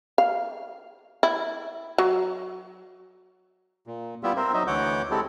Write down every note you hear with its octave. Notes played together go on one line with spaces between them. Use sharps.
F5
E4
F#3
A#2
G3 B3 E4 F4 G4 E5
C4 A#4 C5 E5
F#3 D#4 D#5 E5
D2 E3 C#5 F#5 D6 G6
G#3 C4 E4 G4 A4